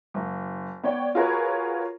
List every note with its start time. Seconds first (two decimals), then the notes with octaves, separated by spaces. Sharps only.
0.14 F#1
0.83 B3 C#5 D5 G5
1.15 F4 F#4 G#4 A#4 B4 C#5